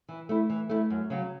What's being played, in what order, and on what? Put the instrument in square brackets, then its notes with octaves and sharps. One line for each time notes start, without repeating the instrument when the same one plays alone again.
[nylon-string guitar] E3
A3 E4
E3
A3 E4
F#2
C#3 F#3